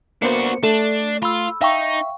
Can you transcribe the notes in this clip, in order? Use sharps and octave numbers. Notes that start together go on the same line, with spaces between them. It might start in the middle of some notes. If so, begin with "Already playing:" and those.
A#3 B3 D4 F#4 C5 C#7
A3 D4 A4
F4 B5 E6
D#4 E5 F5 G5 C#6